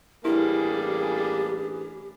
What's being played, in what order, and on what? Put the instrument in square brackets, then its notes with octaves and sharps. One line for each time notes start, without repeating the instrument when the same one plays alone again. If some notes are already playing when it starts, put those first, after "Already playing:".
[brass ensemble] A1 G#4 B4 [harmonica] G3 A#3 D4 [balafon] E4 [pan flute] G4